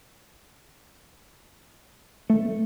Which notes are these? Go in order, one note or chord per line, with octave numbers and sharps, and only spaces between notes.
A3